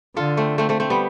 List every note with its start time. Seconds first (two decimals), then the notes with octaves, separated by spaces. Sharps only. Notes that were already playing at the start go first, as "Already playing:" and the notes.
0.16 D3 F4 A4
0.37 A3 C4
0.58 A3 C4
0.69 A3 C4
0.80 A3 C4
0.90 G3 B3